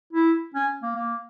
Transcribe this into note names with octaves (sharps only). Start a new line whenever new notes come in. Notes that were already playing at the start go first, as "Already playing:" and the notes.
E4
C#4
A#3
A#3